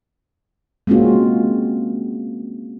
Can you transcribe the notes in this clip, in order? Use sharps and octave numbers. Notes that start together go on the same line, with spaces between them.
G#3 A#3 C4 C#4 F4 F#4